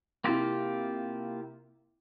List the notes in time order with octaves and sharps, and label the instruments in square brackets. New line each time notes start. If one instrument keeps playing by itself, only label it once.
[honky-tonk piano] C3 E4 [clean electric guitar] A#3 F4 G4